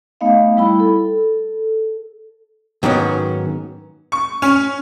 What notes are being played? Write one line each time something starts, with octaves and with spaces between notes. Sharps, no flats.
A3 B3 D#4 D#5 F5
G3 E4 B5
A4
G#2 D#3 F#3 B3 C#4
C#6
C#4